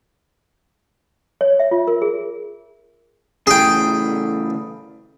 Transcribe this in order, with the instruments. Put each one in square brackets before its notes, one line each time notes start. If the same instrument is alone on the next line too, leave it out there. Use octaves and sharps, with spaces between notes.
[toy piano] C#5
E5
F4
A#4
G#4
[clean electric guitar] C#3 E3 A3 [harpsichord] G#4 G5